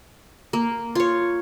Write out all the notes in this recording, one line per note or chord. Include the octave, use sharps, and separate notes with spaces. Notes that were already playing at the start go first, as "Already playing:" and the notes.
A#3
F4 C#5